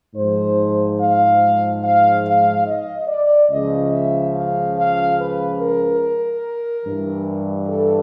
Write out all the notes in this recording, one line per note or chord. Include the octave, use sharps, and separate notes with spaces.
G#2 F3 C5
F5
F5
F5
D#5
D5
C#2 C#3 F3 D#5
E5
F5
F5
B4
A#4
G2 E3
A4